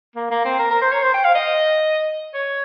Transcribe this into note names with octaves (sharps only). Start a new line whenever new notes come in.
A#3
A#3
C4
A#4
A#4
C5
C#5
C5
G5
F5
D#5
C#5